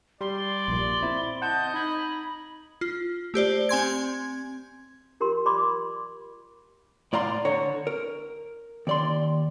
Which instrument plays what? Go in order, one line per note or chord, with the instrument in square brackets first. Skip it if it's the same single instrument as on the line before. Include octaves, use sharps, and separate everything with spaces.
[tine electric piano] G3 [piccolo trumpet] D5 [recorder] C6
[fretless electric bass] A#1 A#2
[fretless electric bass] C4 [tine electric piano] E4
[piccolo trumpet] D#5 [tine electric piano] F#5 A5 [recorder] G6
[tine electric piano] D#4 G#6 [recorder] B5
[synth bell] F4
A3 G4 C5 D5
C4 G#5 C6 G#6
[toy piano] F4 G4 A#4 C6
D5 B5 C6 D6
[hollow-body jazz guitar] A2 D5 F5 A#5 C6
D3 C#5 A#5
A#4
D#2 D5 C6